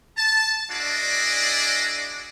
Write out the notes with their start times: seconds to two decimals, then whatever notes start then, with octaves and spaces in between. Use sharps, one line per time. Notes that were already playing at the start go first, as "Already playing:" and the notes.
0.17 A5
0.71 D4 E4 F#4 G#4 D5 D#5